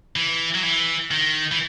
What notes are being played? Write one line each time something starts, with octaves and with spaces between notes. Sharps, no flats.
E3
F#3
E3
D#3
E3